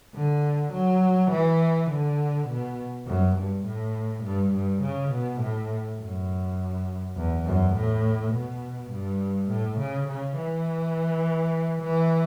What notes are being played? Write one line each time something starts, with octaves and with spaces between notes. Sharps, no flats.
D3
F#3
E3
D3
B2
F#2
G2
A2
G2
G2
C#3
B2
A2
F#2
E2
F#2
A2
B2
G2
A2
C#3
C#3
E3
E3